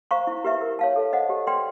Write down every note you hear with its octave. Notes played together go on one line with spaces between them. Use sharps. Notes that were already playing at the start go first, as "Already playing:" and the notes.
C5 F5 A#5 C#6
E4
G4 B4 E5
A#4
C#5 F5 A5
A4
C5 D#5 F#5
G4
B4 D5 G5 C6